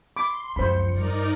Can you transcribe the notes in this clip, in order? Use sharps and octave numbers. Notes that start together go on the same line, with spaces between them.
B5 C6 D6
C#2 F#2 C#3 F3 C5 B5 C#7
G2 D#4 A#4 D5